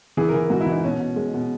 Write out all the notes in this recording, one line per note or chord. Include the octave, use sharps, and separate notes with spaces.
E3 G#4
E3 A#4
G#2 F#4
E4
E3
D#4
B2 C#4
B2
G#3
B2